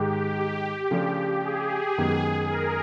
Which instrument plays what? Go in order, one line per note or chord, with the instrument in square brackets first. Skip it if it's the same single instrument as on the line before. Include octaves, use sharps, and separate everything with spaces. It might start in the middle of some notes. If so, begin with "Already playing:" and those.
Already playing: [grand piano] G#2 D#3 G#3 [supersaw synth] G4
[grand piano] C#3 F3 A3 D4 F4
[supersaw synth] G#4
[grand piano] F#2 D#3 G#3 B3
[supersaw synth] A#4